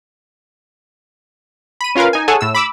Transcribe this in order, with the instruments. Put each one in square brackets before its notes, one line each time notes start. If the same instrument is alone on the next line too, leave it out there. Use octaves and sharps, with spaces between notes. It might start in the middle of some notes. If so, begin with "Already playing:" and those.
[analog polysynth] B5 D#7
C#4 F4 A#4 B4 F5
D#4 G#5
G#4 A4 C#5 F#5 G#5 A5
A2 E6
B5 D6 E6